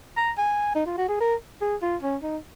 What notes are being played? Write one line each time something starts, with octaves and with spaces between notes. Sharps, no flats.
A#5
G#5
D#4
F4
F#4
G#4
A#4
G#4
F4
C#4
D#4